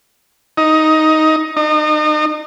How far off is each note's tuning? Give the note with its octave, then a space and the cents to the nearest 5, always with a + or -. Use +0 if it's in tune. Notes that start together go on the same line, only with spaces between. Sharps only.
D#4 +10
D#4 -35